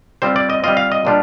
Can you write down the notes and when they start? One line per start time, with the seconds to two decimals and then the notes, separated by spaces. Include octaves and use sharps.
0.22 G3 C4 F4 C5
0.36 D5
0.50 D#5
0.64 G3 C4 F4 D#5
0.77 F5
0.92 D#5
1.05 A#2 G3 D4 F4